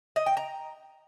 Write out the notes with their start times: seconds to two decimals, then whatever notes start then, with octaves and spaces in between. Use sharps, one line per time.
0.16 D#5
0.26 G5
0.37 A#5